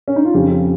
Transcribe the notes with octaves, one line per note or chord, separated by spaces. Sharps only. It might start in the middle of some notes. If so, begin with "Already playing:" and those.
C#4
D#4
F4
F2 C#3 F3 G4